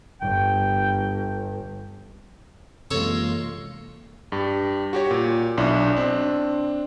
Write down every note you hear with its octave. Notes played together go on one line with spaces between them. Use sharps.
G1 G5
F#2 C3 E3 G#3 A#3 F4 A4 C#5
G2 G4
F#4 G4 C#5
A#2
B1 D4 E4
C4 D4